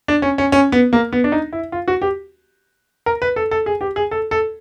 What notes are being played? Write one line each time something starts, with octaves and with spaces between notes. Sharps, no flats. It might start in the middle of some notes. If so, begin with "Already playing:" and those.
D4
C#4
C#4
C#4
B3
A#3
B3
D4
D#4
E4
F4
F#4
G4
A#4
B4
A4
A4
G#4
G4
G#4
A4
A4